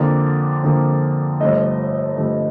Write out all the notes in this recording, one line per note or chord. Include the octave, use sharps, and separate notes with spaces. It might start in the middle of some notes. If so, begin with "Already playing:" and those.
Already playing: F2 D3 F3 A#3 D5
F2 D3 F3 A#3
G1 G2 F3 A3 D#5
G1 G2 F3 A3